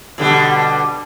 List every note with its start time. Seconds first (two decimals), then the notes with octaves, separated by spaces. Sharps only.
0.18 B2 D3 G3